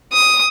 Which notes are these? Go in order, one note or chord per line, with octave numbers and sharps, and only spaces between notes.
D#6